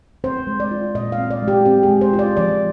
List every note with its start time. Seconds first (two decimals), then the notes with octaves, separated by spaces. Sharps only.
0.24 C4 C5
0.47 G#3
0.60 D5
0.71 F4
0.95 A#2 D#5
1.12 F5
1.18 C4
1.31 D5
1.42 G#3
1.48 G4
1.65 C4 G4
1.83 G#4
1.89 G#3
2.01 C5
2.13 F4
2.19 D5
2.37 F3 D5